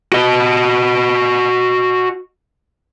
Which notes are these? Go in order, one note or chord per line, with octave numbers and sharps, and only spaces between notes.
F#4 D#5